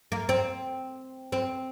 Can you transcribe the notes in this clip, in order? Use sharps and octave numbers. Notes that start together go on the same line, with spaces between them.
A#3
C4
C4